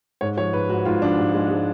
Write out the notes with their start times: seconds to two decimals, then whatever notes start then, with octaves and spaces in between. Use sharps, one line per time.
0.21 G#2 C#5
0.37 F3 C#5
0.53 G#2 B4
0.69 G#2 F#4
0.85 G#2 F4
1.02 F3 D4
1.18 G#2
1.35 G#3
1.51 G#3